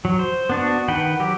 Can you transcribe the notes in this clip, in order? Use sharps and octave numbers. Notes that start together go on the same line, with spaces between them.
F#3
C5
B3 D4 F#4
D#3 B4 F#5 G5
F#3 G4